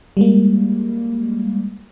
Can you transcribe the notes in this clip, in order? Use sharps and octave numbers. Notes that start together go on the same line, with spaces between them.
G3 G#3 A#3